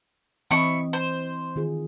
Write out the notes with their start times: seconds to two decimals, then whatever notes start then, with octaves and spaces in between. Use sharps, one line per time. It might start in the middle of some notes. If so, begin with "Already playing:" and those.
0.51 E3 C4 E4 D#5 C#6
0.93 C5
1.56 D#3 F4 G#4